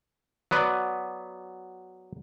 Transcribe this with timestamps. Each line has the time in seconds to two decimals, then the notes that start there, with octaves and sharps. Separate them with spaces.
0.51 F#3 B3 B4 D5